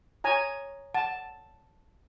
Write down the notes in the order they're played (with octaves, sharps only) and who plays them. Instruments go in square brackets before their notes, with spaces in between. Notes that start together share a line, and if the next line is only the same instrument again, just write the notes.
[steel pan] C#5 G#5 A#5
[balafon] F#5 [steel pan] A5